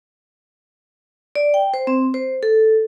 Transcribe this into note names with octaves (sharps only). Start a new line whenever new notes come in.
D5
G5
C5
C4
C5
A4